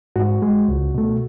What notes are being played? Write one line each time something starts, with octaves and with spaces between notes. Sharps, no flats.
G#2 F#4
G#3
C#2
B2 A3